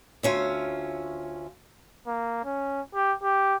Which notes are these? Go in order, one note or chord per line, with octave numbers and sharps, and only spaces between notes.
D2 C#4 F4 E5
A#3
C#4
G4
G4